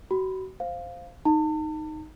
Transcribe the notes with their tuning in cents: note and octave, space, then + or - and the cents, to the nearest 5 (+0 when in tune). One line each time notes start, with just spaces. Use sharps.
F#4 +35 B5 -10
C5 +0 F5 +0
D#4 +0 A5 +40